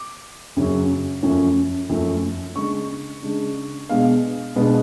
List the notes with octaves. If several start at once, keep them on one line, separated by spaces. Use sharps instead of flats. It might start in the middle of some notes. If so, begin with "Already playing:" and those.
Already playing: D6
F#2 C#3 F#3 C#4
F#2 F3 A3 C#4
F#2 F3 A3 C#4
C#3 G#3 D4 C#6
C#3 G#3 D4
B2 G#3 B3 D4 F5
B2 G#3 B3 D4